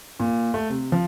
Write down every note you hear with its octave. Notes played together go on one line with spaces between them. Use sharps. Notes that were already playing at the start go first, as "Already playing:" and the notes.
A#2
A3
C3
F3